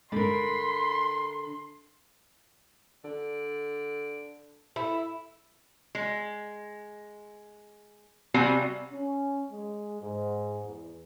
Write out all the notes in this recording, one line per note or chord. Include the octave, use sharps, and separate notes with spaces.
G2 D3 G#3 A#4 B5 C6
D3 D5
E4 A4
G#3
C3 G3 C4 F#4 F5 G#5
C#4
G#3
G#2
E2